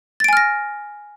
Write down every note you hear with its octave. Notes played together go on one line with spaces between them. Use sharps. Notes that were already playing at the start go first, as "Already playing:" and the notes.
G#5 F6 A6 A#6 D7